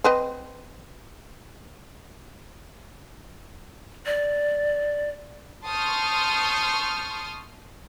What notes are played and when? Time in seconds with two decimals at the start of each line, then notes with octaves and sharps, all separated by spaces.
0.04 C4 B4 D#5
4.06 D5
5.66 A5 C6 C#6 D#6 F6 G6